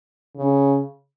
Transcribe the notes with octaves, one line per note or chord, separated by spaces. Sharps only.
C#3